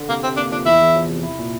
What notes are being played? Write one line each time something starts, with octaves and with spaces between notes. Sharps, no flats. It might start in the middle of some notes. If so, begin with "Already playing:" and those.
Already playing: D3
C3 A#3
C3 C4
A#3 D4
F3 D4
E2 E4
E2
F3
C3
E4
A#2